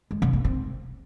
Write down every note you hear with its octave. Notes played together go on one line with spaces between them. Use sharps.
G#3
C3
A#3
C4